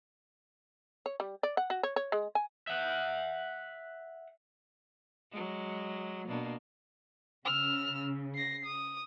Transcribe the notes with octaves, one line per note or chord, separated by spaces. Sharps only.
C#5
G3
D5
F#5
F#4
C#5
C#5
G#3
G#5
E5 F#5
F#3 G#3
B2 A#3 D4
C#3 E6 F6
A#6 C7
D#6